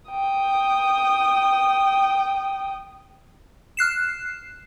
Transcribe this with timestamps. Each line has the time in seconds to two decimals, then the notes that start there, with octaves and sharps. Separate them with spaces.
0.11 G5 D#6
3.77 F6 F#6 C7 E7